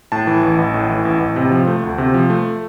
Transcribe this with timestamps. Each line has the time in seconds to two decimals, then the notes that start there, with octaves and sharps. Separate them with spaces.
0.12 A2 A5
0.27 E3
0.43 A1
0.58 A1
0.74 A2
0.90 E3
1.05 A1
1.20 A1
1.36 C3
1.51 F3
1.67 A3
1.83 D2
1.98 C3
2.14 F3
2.30 A3